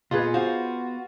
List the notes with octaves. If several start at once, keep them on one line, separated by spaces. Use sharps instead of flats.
A#2 B3 F4 G#4 D#5
F#4 C5 F5